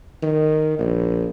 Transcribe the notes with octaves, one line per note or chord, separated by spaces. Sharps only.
D#3
A#1